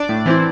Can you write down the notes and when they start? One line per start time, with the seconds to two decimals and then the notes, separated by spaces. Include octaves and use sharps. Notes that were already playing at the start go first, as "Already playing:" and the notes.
Already playing: D4 D5
0.09 A2
0.26 E3 C4 E4